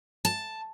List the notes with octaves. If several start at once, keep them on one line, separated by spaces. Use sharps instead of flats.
A5